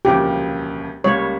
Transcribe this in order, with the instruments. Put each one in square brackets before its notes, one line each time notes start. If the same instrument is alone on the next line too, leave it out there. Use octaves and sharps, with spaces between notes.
[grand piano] E1 D2 C#3 F3 A#3 [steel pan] G4
[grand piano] C#2 C#3 G3 A#3 [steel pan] C#5